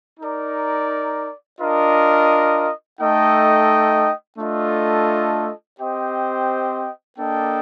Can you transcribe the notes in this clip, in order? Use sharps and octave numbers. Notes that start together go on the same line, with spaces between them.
D#4 A#4 D5
D4 F4 A#4 D#5
A3 D#4 A4 D#5 G5
A3 D4 F4 A4 D#5
C4 G4 C5 D#5 G5
A#3 D4 A4 D#5 G5